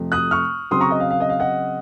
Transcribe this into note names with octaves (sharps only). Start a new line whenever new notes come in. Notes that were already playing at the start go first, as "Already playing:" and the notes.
Already playing: F2 C3 F3 A3
D#6 F#6
C#6 F6
C#3 F#3 C4 C6 D#6
A#5 C#6
D#5
F5
F5
D#5
F5
D#5 F#5